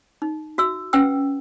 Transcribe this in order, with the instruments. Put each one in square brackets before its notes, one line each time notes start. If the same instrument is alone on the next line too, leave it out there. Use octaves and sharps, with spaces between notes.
[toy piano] D#4
F#4 E5 E6
C#4 B4 F#5 G5 E6